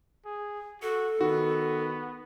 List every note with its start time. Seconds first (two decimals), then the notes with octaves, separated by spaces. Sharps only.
0.25 G#4
0.82 F#4 A4
1.21 D#3 B3 F#4